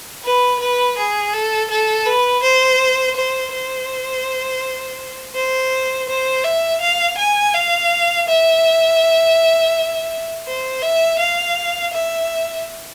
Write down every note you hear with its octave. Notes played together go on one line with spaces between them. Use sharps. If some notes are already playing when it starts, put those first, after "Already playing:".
B4
B4
G#4
A4
A4
B4
C5
C5
C5
C5
C5
E5
F5
G#5
F5
E5
C5
E5
F5
E5